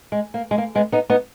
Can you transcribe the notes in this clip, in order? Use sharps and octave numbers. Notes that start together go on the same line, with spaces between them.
G#3
A#3
G#3
A#3
G#3 B3
B3 D#4
B3 D#4